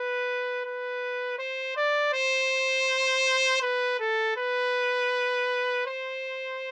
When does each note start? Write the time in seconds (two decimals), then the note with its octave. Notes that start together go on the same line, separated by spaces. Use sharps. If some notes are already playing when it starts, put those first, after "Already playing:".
Already playing: B4
0.65 B4
1.39 C5
1.76 D5
2.13 C5
3.62 B4
3.99 A4
4.37 B4
5.86 C5